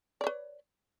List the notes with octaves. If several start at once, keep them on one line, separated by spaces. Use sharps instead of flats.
B4 C#5 D5